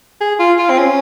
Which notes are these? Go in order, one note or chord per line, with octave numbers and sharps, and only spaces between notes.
G#4
F4
F4
C4
C#4